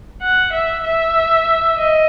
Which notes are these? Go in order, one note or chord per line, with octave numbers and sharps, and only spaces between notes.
F#5
E5
E5
D#5